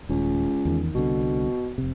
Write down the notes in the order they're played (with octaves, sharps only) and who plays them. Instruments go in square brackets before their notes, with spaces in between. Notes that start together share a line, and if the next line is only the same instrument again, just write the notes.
[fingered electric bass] D#1 [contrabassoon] C#2
[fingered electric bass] E2 D#3
[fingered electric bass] C2 D3 [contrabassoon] B2
[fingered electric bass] F1 C3